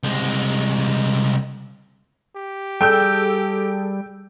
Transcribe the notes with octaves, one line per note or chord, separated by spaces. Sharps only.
C2 G#3
G4
G3 G#4 A4 G5 E6 G6